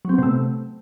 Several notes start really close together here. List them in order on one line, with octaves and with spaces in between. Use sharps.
F#3 C4 B3 C3 A3